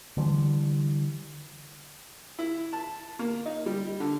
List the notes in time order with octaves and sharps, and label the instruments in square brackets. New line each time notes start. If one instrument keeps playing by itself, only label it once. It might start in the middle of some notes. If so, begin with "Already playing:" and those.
[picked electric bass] D3 E3 G3
[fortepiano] E4
A5
A#3
D#4
G3
D3